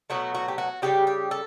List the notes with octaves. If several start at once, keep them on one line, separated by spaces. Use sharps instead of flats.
B2 F#3 A3 F#4
F#4
G4
F#4
C#3 E3 G3 G4
G4
A4